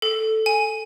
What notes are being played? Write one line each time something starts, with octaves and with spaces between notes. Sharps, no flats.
A4
G#5